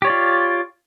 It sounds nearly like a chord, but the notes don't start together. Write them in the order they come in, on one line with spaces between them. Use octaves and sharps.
G4 C#5 D5 F4